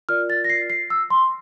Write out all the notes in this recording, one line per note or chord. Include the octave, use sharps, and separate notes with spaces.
F4 A#4 D5 F6
A6
A#6
C7
C7
E6
C6